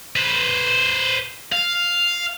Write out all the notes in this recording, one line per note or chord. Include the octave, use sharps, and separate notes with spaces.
B4 C5
F5